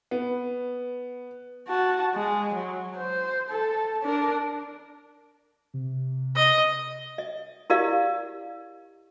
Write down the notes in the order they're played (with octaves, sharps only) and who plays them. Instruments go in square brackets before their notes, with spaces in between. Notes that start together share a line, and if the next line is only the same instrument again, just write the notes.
[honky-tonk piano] B3
[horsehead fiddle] F#4 A5
G#3
F#3
C5
A4
D4 A#4
[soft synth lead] C3
[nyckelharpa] D#5
[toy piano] D#5
E4 G4 A#4 D5 D#5 F5